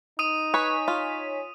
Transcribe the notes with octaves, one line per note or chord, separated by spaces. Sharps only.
D#4 D#6 D#7
B4 C#5 G#5 B6
F4